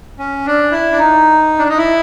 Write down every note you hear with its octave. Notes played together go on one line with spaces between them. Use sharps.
C#4
D4
E4
D4
D#4
D4
D#4
E4